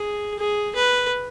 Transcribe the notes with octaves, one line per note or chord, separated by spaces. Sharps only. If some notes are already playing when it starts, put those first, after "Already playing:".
Already playing: G#4
G#4
B4